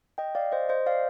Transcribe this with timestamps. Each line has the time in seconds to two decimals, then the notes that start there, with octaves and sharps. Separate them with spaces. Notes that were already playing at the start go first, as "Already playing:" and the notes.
0.18 D#5 G5
0.35 D5 F5
0.52 C5 D#5
0.69 C5 D#5
0.86 D5 F5